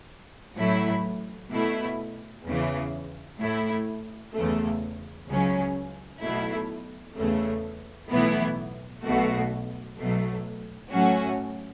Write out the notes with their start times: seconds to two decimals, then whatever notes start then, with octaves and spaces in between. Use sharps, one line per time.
0.56 A1 A2 F#3 A3 E4
1.50 B2 A3 E4
2.44 E2 C#3 E3
3.39 A2 A3 E4
4.33 E2 C#3 A3
5.27 C#2 C#3 F#3 C#4
6.21 B1 B2 A3 E4
7.16 E2 C#3 A3
8.09 B1 A2 E3 B3 E4
9.04 B1 B2 A3 F#4
9.97 B1 B2 F#3 A3
10.91 A2 F#3 A3 C#4 F#4